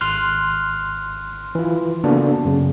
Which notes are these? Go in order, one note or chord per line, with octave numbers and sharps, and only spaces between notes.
G#1 C6 F6 F#6
E3 F4
C#3 A#3 B3 D4 F#4 A4
F#2 C#3